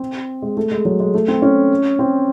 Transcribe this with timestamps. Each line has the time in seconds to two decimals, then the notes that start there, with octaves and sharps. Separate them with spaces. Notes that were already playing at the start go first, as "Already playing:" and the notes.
Already playing: C4
0.42 G#3
0.57 A3
0.72 G#3
0.85 F#3
1.00 G#3
1.14 A3
1.28 C4
1.42 C#4
1.99 C4